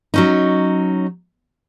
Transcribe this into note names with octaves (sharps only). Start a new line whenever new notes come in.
F#3 C#4 D#4